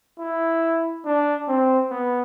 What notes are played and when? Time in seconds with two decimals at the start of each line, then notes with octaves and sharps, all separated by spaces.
0.20 E4
1.06 D4
1.48 C4
1.91 B3